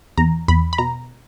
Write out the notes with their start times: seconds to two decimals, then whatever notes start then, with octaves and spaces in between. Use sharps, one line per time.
0.18 E2 A#5
0.48 E2 B5
0.73 B5
0.78 B2 A#5